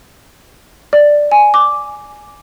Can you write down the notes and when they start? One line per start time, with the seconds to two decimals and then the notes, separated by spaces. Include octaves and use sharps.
0.93 D5
1.32 G#5
1.54 D6